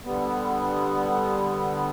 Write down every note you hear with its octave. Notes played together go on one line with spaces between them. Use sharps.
D3 G3 B3